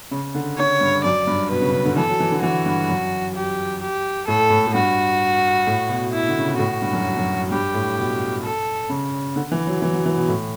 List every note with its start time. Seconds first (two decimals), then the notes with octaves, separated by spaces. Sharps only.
0.11 C#3
0.35 D3
0.58 D3 C#5
0.81 G2
1.04 F#2 D5
1.27 G2
1.50 B2 B4
1.61 C#3
1.74 C#3
1.85 D3
1.96 E3 A4
2.08 F#3
2.20 E3
2.31 D3
2.42 E3 F#4
2.66 G2
2.89 F#2
3.35 G4
3.82 G4
4.27 A2 A4
4.50 A2
4.66 A2
4.74 G2 F#4
5.67 A2
5.89 B2
6.13 E4
6.28 D3
6.38 C#3
6.49 B2
6.58 A2 F#4
6.82 G2
6.93 F#2
7.17 F#2
7.51 G2 G4
7.74 A2
7.98 B2
8.43 A4
8.89 C#3
9.36 D3
9.52 E3
9.67 F#3
9.82 E3
9.93 F#3
10.06 E3
10.17 B2
10.28 A2